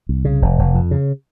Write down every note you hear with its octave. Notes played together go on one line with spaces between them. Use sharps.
C2
C#3
F1
F1
F2
C#3